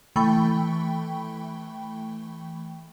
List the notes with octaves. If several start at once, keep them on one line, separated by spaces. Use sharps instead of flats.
E3 A3 G5 B5 C#6